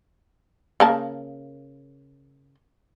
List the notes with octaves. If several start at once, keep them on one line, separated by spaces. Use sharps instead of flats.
C#3 A#3 A5